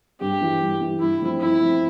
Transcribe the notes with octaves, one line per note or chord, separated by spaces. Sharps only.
G2 G4
E3 G3
G2
E3 G3
G2 E4
F3 A3 C4
G2 E4
F3 A3 C4